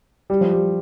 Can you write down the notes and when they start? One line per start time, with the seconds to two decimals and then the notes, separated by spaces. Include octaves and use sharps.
0.30 G3
0.41 F3
0.53 G3